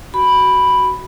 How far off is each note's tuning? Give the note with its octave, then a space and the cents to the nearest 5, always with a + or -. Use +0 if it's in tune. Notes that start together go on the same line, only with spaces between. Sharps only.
F#4 +20 B5 +0